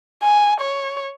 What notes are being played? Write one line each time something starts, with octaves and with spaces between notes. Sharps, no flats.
G#5
C#5